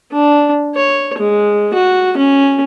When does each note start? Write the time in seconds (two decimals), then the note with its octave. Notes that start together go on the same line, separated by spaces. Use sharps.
0.13 D4
0.75 C#5
1.19 G#3
1.74 F#4
2.18 C#4